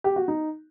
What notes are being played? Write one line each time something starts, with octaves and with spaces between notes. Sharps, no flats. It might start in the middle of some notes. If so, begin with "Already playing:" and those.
G4
F#4
D#4